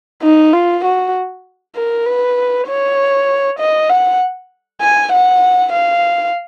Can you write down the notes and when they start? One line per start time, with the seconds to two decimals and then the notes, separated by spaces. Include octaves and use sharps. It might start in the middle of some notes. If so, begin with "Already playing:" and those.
0.23 D#4
0.53 F4
0.85 F#4
1.76 A#4
2.06 B4
2.68 C#5
3.60 D#5
3.90 F#5
4.82 G#5
5.12 F#5
5.73 F5